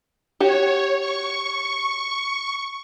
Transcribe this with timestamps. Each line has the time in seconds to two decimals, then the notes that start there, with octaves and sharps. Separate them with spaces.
0.40 F#4 G4 C#5
0.97 C#6